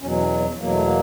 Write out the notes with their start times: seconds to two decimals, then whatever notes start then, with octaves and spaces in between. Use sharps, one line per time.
0.01 E2 B2 F#3 C#4
0.19 C#4
0.39 B3
0.57 E2 B2 F#3 A#3
0.70 A3
0.83 A#3